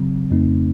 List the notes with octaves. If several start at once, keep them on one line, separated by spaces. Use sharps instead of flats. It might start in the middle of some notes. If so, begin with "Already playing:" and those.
Already playing: C#3 F#3 C4
F2 C#3 A3 C4 D#4